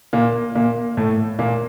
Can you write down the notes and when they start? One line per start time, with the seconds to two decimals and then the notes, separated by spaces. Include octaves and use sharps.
0.13 A#2 A#3
0.55 A#2 A#3
0.97 A2 A3
1.39 A#2 A#3